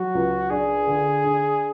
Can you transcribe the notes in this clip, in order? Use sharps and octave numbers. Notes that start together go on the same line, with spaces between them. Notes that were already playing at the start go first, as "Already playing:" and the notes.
Already playing: F#3 F#4
C#2
D4 G#4
D3
D4